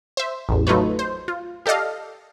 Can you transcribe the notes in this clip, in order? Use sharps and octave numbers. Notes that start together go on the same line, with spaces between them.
C5 E5
A1 E2
F#3 A3 D#4 F4 B4 C#5
C5
F4
G4 A4 D5 D#5 F5